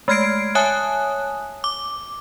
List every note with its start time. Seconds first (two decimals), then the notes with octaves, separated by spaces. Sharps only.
0.08 G#3 A3 F6 G#6 C7 D7
0.55 C#5 E5 G#5 A5 D#6 F#6
1.64 D6